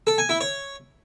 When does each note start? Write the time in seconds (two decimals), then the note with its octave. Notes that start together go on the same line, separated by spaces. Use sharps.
0.07 A4
0.18 G#5
0.29 E4
0.41 C#5